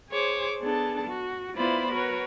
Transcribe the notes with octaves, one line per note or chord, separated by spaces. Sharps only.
G#4 C5 C#5 D6
B3 D4 G#4 A4 A5
F#4
B3 E4 F4 C5 D5 B5
F#4 A#4 B4 C#5